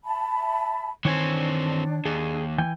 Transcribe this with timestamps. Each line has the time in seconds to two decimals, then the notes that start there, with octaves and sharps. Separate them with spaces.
0.04 E5 A5 B5
1.05 D#3 E3 C4 D4 C#5 G#5
2.05 D#2 G#4
2.58 E3 G5 G#5